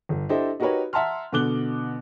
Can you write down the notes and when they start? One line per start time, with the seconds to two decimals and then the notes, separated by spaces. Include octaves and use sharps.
0.09 G1
0.29 D4 E4 G4 A4 C5 D#5
0.60 D#4 F#4 G4 A#4 B4 C#5
0.93 E5 F#5 A5 A#5 C6 F6
1.32 B2 D3 B3 D6 F#6 G7